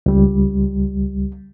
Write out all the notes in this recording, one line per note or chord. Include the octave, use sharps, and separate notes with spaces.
C#2 G3